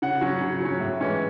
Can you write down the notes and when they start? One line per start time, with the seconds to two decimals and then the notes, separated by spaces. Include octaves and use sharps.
0.02 C#3 F#5
0.21 F#3 C#4
0.41 C#3
0.60 F#3 C#4
0.80 A2
1.00 E3 G#3 C#4